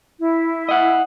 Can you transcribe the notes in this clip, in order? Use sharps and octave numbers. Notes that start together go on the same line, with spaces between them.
E4
D#5 F#5